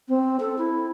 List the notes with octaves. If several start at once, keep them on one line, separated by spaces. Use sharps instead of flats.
C4
A4
E4